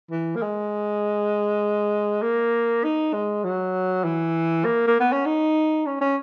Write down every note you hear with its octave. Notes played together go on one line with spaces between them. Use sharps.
E3
A#3
G#3
A#3
D#4
G#3
F#3
E3
A#3
A#3
B3
C#4
D#4
C#4
C#4